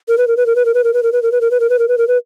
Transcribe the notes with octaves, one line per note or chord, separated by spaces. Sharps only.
A#4
B4
A#4
B4
A#4
B4
A#4
B4
A#4
B4
A#4
B4
A#4
B4
A#4
B4
A#4
B4
A#4
B4
A#4
B4